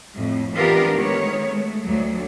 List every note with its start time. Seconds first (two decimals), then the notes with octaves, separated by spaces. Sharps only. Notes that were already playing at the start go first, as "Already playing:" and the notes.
0.15 F2 A2
0.54 E3 B3 D4 F4 G4 A#4
0.95 D#3 G#3 A3 B3 C#5
1.47 G#3 A3
1.81 D2 F#3